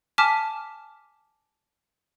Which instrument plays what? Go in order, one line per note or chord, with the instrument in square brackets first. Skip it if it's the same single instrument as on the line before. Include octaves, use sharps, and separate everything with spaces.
[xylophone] G#5 A5 D6 F6 B6 E7